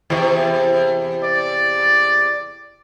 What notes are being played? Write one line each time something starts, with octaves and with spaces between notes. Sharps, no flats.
E2 C3
D5